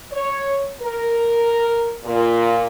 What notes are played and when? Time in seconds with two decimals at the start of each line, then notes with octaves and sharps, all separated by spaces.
0.11 C#5
0.80 A#4
2.04 A#2